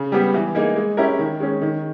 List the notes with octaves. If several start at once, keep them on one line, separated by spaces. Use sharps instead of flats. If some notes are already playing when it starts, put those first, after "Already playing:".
Already playing: C#3
G3 B3 G4
E3
A#3 D#4 G#4
G#3
C#4 E4 G4 A#4
D#3
G#3 C#4
D#3